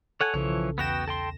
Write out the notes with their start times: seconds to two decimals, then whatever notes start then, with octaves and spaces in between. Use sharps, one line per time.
0.21 A4 C#5 F#5 G#5
0.34 B1 C#3 E3 F3 C#5
0.78 E2 B3 F#4 G5 A#6 E7
1.08 A4 G5 C6